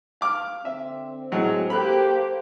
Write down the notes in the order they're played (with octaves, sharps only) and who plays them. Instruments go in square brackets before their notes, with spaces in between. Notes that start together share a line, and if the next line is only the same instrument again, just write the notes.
[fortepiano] F5 D6 F6
[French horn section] D3 C4 [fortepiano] E5
[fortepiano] A2 F#3 G#3 [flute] G#4
[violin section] A#3 G4 [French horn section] A4 [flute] C5 [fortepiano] B5 F#6